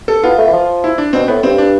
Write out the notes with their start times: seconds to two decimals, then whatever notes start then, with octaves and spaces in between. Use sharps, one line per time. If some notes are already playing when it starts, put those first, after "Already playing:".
0.08 A4
0.24 B3 F4
0.38 A3
0.47 E3
0.53 F3
0.84 E4
0.98 D4
1.13 B2 C4
1.28 A2 B3
1.43 G2 C4
1.58 D4